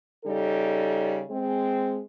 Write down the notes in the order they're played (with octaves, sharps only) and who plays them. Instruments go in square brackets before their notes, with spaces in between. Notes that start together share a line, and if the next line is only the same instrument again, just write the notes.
[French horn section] C#3 G3 D#4 A4
G#3 C4